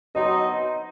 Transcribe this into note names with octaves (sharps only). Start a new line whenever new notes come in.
B2 F#3 C4 D#4 D#5